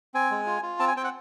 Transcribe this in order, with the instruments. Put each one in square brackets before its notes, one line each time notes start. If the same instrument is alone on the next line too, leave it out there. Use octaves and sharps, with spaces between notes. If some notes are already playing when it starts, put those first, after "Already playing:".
[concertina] C4 G#5
G#3
F4
F4
C4 A5
G#5
C4 G5
F#5